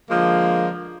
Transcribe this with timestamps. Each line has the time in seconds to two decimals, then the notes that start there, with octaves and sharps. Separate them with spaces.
0.10 D3 F3 G#3 A#3